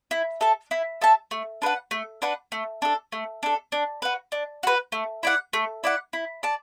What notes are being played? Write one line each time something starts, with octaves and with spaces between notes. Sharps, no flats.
E4
A4 E5 A5
E4
A4 E5 A5
A3
D4 B4 F#5
A3
D4 B4 F#5
A3
D4 A4
A3
D4 A4
D4
F#4 B4
D4
F#4 B4
A3
E4 D5 F#5
A3
E4 D5 F#5
E4
D5 A5